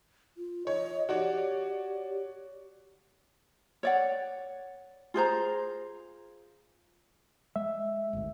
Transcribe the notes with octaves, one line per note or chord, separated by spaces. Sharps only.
F4
C#5 D#5
F#4 G4 C#5 D5
C#5 D5 F#5
F4 G#4 C5 A#5
G#3 E5
G#1 D2